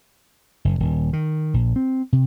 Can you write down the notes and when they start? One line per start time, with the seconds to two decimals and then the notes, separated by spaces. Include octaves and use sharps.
0.65 F#1
0.80 D#1
1.13 D#3
1.54 A#1
1.76 C4
2.13 C3